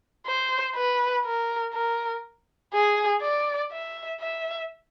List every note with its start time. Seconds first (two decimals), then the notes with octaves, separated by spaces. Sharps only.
0.27 C5
0.76 B4
1.26 A#4
1.74 A#4
2.73 G#4
3.23 D5
3.72 E5
4.21 E5